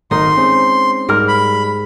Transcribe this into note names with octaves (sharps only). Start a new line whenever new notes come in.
G#1 A3 D#4 A#4 C6
G#3 C4 C#4
G#2 G3 A#4 F6
B5